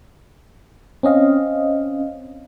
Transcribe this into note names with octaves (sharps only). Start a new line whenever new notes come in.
C4 C#4 D#5 F5